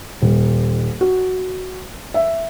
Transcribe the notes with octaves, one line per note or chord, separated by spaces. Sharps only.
D#1
F#4
E5